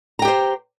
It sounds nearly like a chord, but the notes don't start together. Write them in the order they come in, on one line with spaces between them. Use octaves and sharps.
A#5 G5 G4 C5